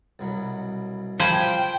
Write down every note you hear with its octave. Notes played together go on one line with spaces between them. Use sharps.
C2 B2 F#3
F3 C5 G5 G#5 B5